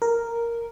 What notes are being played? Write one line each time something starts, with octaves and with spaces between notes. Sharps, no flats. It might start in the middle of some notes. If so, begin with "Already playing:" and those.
A#4